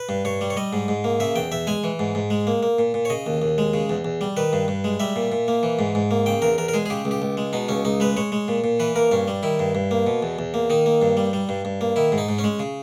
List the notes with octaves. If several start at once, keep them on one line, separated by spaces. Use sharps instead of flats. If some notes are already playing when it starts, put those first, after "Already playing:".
Already playing: B4
G2
G2 C#5
G3
C#5
G3 D#5
G#2
G#2
A#3
C#3 E5
E2 G5
E2 E5
G#3 G#5
E3
G#2
G#2
G#3
A#3
A#3
A#2
A#2
C#5
C#3 D#5
D#2
D#2
G#3
C#3
E2
E2
G3
D#3 B4
G2
G2
G#3
G3 E5
A#2
A#2
A#3
E3
G#2
G#2
A#3
C#3 G5
E2 A#4
E2 A#4
A#4
G#3 G#4
G#4
C#3 G4
C#2
G4
C#2
G#3
B2 D#4
C#2 C#4
C#2 D#4
G#3 B4
G#3 C#5
G#3
A#2
A#2
E3 B4
A#3 A#4
G2 C#4
G3
D#3 E4
G2
G2
A#3
B2
E2
E2
A#3
D#3 D#4
A#3
G2
G3
G3
G2
G2
A#3
D#3 E4
G#2
D#4
G#2
C#4
G#3
C#3